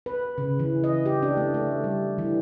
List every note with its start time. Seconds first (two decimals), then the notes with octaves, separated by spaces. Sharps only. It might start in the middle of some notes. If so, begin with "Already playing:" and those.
0.06 B4
0.38 C#3
0.59 E3
0.84 D#5
1.06 G4
1.23 D4
1.37 A3
1.54 A3
1.84 G3
2.18 E3